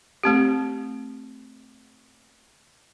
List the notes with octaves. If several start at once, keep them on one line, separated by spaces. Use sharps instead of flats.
A3 C4 G4